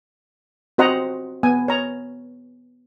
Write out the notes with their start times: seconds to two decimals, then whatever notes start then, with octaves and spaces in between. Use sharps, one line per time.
0.78 C4 F#4 C5 D#5 F#5 A#5
1.43 B3 G#5
1.68 C#5 A#5